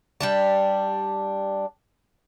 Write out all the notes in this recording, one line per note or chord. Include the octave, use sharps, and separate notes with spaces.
G3 D4 A5